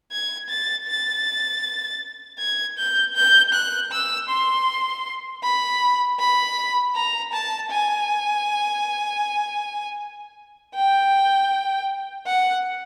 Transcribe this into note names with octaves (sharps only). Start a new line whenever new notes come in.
G#6
A6
A6
G#6
G6
G6
F#6
E6
C6
B5
B5
A#5
A5
G#5
G5
F#5